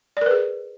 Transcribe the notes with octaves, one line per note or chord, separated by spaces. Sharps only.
G#4 A#4 B4 D5